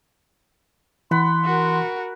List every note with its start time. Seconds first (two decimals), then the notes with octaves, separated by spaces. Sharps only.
1.11 E3 F#5 B5 C6
1.45 F#4 A#4